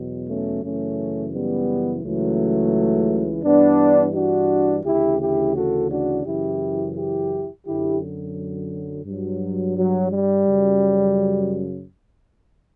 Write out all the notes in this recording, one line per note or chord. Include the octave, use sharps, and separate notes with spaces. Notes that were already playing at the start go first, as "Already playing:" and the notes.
Already playing: E2 B2 F#3
A3 C#4
F#2 C#3 E3 A3 C#4
G3 B3
C#2 C#3 E3 F#3 A3
G2 E3 B3 D4
D4 F#4
D2 C#3 E3 E4 G4
E4 G4
F#4 A4
D4 F#4
F#2 C#3 E3 E4 G4
E4 G4
F#2 D3 F#3 E4 G4
G2 F#3
F#3
G3
F#2 C#3 F#3